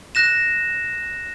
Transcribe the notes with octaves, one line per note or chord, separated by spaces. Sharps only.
F#6 A#6 E7